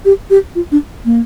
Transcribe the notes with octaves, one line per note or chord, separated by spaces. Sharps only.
G4
G4
F4
D4
A#3